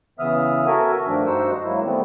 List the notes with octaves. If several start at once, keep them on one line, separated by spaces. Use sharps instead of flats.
C#3 E3 B3 E5 D#6 F6
F#4 A4 A#4 E5 G#5
G2 D#3 F3 A3 D4
G2 D#4 F#4 C5 F#5 E6
F#3 G#3 A#3 E4
D#3 G3 A3 B3 C4